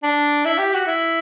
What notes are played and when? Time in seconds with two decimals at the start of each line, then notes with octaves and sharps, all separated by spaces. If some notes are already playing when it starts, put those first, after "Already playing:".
0.03 D4
0.45 E4
0.59 G4
0.74 F#4
0.87 E4